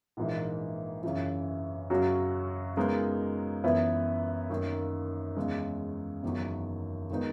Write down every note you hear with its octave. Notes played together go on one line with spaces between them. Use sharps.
A#1 G#2 E3 A#3
F#2 C#3 E3
F#2 C#3 F#3 C#4 F#4
C#3 G#3 B3 D#4 A#4
F#2 E3 B3 E4 B4
F#2 D#3 A#3
E2 C#3 G#3
F#1 E2 D#3 F#3
D#3 G#3 B3 D#4